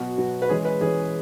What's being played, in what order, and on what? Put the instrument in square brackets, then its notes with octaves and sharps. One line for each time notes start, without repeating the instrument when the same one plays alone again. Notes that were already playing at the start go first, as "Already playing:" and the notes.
Already playing: [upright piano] B2 F#3 B3 [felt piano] F#4
[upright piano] B2 F#3 B3
[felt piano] B4
[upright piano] E3 G#3 C#4 [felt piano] G#4
[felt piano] B4
[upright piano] E3 G#3 C#4 [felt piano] G#4